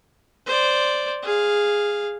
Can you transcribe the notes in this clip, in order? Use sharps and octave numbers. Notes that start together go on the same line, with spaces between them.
C5 D5
G#4 F5